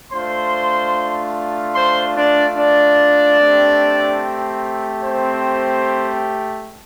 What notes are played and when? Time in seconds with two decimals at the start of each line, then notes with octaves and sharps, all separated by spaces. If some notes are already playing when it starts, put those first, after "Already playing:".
0.12 A3 D4 F4 C5 C6
1.75 C5 C6
2.17 D4 D5
2.57 D4 D5
3.40 A3 C4 G4
5.02 C4 C5